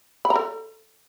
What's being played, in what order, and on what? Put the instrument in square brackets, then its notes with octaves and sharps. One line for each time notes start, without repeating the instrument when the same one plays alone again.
[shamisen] B5
A#5
A4